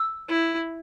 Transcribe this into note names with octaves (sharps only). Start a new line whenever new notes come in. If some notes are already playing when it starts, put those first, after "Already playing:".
Already playing: E6
E4